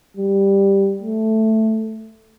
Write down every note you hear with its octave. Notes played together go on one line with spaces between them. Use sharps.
G3
A3